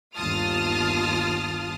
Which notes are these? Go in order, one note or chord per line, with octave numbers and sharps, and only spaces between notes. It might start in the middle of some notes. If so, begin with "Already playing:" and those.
G1 D#2 F4 A5 D#6 F6